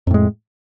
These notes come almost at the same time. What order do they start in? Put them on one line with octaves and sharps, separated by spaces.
F2 A2 G#3